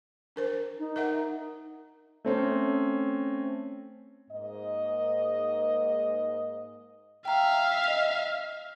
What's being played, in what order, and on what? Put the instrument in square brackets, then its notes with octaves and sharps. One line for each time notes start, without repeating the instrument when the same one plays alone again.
[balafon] D4 A#4 C5
[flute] D#4
[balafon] A#4 E5 F#5
[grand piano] A3 C4 C#4
[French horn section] G#2 A#3 D#5
[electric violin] E5 F5 [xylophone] G5 A#5
[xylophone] D#5 F7